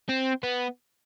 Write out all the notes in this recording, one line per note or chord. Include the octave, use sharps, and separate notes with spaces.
C4
B3